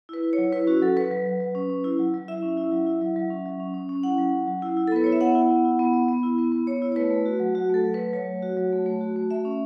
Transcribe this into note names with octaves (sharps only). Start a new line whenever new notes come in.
E4 B4
E4
C#5
F#3
E4 B4
C#4 F#4
F#3 A4
F#3 B4
F#3
F#3
F#3
C#4
C#4
E4
F#3
F#3
E4 E5
C#4
E4
F#3
E4
F#3
F#3
C#4
F#3
C#4
C#4
C#4
E4 F#5
F#3
C#4
F#3
E4
E4
A4
B3 B4
E4 C#5
E5
B3 F#5
E4
B3
E4
B3
B3
B3
E4
B3
B3
B3 C#5
E4
C#5
A3 B4
A3
F#4
F#3
F#3 F#4
A3 A4
F#3
F#3 B4
F#3 C#5
A3
F#4
F#3
A3
A3
F#4
A3
A3 E5
C#4